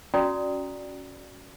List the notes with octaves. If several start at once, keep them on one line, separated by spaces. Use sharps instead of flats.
C#4 F#4 D5 G5 A#5 D#6